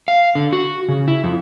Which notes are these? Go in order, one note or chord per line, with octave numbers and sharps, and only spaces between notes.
F5
D3
F#4
C#3
E4
F2